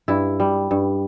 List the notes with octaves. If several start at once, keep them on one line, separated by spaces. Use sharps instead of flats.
G2 E4
G3
G2